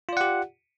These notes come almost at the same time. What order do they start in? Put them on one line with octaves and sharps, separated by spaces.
F4 D5 F#5 G4